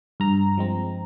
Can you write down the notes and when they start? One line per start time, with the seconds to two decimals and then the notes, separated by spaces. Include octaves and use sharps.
0.20 G2 A#5
0.58 F3 G#3 C4